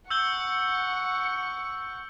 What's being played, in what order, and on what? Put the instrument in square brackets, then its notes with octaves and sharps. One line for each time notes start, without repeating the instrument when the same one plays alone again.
[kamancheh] F#5 C#6 [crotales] E6 G6 G7